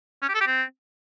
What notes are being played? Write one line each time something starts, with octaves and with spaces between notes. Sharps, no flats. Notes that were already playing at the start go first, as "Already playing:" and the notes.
C#4
G4
A4
G4
C4